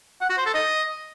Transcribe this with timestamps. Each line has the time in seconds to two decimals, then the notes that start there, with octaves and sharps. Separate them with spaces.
0.21 F#5
0.29 F#4
0.38 C5
0.46 A4
0.54 D#5